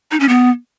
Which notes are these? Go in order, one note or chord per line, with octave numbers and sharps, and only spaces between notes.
D#4
C#4
B3